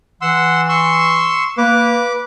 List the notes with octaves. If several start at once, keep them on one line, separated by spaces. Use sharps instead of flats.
E3 F#5 C6 E6
C6 C#6 E6
A#3 B4 D6